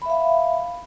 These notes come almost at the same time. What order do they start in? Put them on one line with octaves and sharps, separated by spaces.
B5 E5 F5